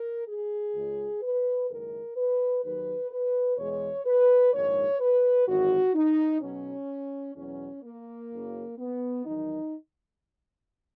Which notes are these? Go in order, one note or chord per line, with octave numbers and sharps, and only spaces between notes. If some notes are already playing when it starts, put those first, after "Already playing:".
Already playing: A#4
G#4
C#2 C#3 G#3
B4
F#1 F#2 D#3 G#3 A#4
B4
D#2 D#3 F#3 B4
B4
E2 B2 G#3 C#5
B4
A#1 G#2 D#3 G#3 C#5
B4
G#1 F#2 E3 F#4
D#4
B1 B2 F#3 C#4
E2 B2 F#3 C#4
A#3
F#1 F#2 C#3
B3
E2 D#3 F#3 D#4